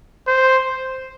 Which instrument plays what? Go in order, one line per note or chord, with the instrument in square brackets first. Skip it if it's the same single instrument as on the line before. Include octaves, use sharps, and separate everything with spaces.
[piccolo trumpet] C5